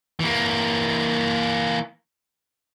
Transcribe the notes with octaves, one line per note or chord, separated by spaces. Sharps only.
E3 A#3